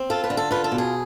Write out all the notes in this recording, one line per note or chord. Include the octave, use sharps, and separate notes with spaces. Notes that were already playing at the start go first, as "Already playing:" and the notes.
Already playing: C4
F4 A4
B4
D3
A4
F4 B4
A4
B2
G#4